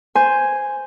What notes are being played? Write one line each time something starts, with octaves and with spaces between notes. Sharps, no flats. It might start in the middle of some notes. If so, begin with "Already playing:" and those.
C5 G#5